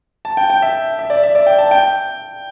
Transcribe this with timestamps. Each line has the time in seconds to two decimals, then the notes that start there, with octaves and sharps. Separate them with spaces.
0.25 A5
0.37 G5
0.50 G5
0.62 E5
0.99 E5
1.10 D5
1.23 E5
1.35 D5
1.46 G5
1.59 A5
1.71 G5